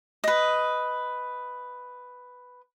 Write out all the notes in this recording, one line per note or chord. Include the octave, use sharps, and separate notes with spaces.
B4 D#5